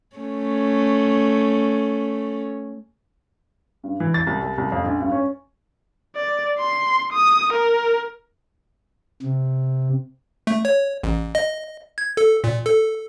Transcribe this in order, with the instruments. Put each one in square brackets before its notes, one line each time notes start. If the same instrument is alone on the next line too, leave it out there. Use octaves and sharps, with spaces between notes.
[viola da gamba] A3 C#4
[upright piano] G2
E3
A6
C2
C2
C2
F2
A#1
G2
C#4
[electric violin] D5
C6
D#6
A#4
[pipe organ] C3
[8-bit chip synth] A3
C#5
A1
D#5
G#6
A4
A#2
A4